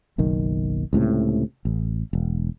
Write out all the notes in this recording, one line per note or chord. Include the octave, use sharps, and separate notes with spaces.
F#1 B1 D#3
C#2 A2 C3
A1
E1